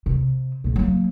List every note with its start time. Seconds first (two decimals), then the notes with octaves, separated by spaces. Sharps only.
0.06 C3
0.64 C#2 A#2
0.76 F#3 A#3